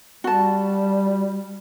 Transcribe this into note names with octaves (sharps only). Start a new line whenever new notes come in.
G3 F#4 A5